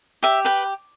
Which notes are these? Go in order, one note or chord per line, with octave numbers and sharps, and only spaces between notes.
G4 E5
B4 G5